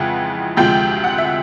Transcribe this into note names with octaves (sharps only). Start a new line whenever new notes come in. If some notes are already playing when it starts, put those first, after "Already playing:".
Already playing: F2 C#3 E3 G#3 F#5
D2 C3 F3 G#3 G5
F#5
E5